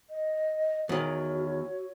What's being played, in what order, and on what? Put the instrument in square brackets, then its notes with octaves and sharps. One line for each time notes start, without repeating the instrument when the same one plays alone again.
[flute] D#5
[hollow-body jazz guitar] E2 D#3 [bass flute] F#4 [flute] C#5